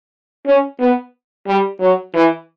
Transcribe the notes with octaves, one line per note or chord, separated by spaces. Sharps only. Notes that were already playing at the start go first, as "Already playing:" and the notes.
C#4
B3
G3
F#3
E3